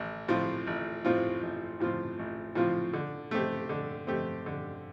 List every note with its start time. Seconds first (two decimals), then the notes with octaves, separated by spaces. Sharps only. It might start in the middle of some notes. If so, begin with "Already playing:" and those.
Already playing: A1
0.28 A2 F3 C4 F4
0.67 A1
1.05 A2 F3 C4 F4
1.42 A1
1.80 A2 F3 C4 F4
2.19 A1
2.55 A2 F3 C4 F4
2.93 D3
3.31 A3 C4 G4
3.69 D3
4.07 A3 C4 G4
4.46 D3